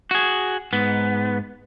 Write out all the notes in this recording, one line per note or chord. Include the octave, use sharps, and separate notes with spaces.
F#4 G#4
G#2 B3